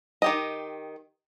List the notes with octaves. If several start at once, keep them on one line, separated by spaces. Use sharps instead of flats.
D#3 G4 D#5